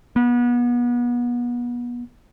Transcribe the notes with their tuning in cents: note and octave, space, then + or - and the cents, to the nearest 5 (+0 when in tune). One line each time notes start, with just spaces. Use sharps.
B3 -30